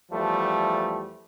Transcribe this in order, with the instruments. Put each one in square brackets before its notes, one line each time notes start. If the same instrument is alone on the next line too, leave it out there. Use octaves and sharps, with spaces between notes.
[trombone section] E2 F3 G3 A3